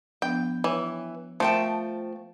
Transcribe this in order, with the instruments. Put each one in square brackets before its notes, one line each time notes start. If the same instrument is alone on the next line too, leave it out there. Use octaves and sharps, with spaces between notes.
[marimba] F3 B3 D4 [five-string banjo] G5
[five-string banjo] E3 [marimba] C#5 G5 D6
[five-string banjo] F3 [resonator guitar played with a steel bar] A3 G5 A5 [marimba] A#4